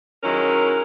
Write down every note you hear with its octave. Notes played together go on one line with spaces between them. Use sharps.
D#3 F#3 G#3 C#4 E4 A#4